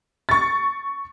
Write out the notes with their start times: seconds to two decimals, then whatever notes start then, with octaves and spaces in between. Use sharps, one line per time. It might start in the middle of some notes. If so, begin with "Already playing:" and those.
0.29 C#6 A6